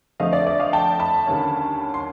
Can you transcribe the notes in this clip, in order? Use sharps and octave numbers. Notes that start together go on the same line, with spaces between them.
F2 D3 F3 A3 C4 D#5 F5
D5 E5
D5 E5
D#5 F5
G5 A5
A5 B5
D#2 D3 G3 A#3 C#4
C6